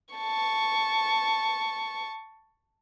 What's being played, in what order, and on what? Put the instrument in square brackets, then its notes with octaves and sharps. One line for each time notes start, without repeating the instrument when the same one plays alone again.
[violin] A5 C#6